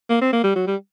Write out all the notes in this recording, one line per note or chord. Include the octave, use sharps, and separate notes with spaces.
A#3
C4
A#3
G3
F#3
G3